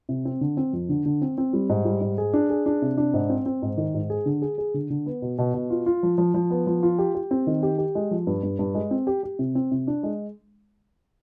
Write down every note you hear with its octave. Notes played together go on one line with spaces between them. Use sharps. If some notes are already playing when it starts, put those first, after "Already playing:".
C3
C4
D3
C4
F2
D3
D3
C4
C4
G3
G#2
G3
G#2
G#4
D4
G#4
D4
C3
D4
G#2
C4
C4
G#2
D#3
G#2
G#4
D3
G#4
G#4
D3
D3
B3
B2
B2
B2
F4
F4
F3
F3
F3
B3
F3
F4
G4
G4
C4
D#3
G4
G4
G#3
F3
G2
G2
G2
G#3
C4
G4
G4
C3
C4
C3
D4
G#3